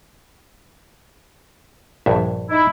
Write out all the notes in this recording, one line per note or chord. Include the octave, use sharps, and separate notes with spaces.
A#1 G2 E5
D#4 E4